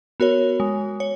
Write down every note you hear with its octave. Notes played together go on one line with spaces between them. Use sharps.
B3 F#4 A#4 C#5
G#3
C#5